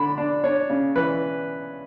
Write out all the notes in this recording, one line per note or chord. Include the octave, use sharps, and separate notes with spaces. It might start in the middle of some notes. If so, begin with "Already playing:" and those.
Already playing: D3 D4 B5
D4
D4 C#5
C#3
E3 B4